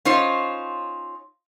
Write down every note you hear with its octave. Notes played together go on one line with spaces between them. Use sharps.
C#4 D#4 F4 C5